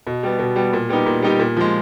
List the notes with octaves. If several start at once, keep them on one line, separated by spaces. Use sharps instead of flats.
B2
G3 B3
B2
G3 B3
A#2
G3 B3 D#4 G4
A#2
G3 B3 D#4 G4
A#2
F3 G#3